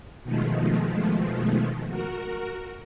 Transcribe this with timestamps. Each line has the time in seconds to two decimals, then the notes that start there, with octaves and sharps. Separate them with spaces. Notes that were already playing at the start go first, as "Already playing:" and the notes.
0.23 B2 D#3 F3 G#3 A3
1.89 F#4 A#4